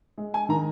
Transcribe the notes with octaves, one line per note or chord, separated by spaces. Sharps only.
G#3
G#5
D#3 A#5